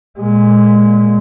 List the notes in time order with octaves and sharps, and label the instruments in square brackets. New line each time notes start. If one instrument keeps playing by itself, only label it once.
[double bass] A#2 G#3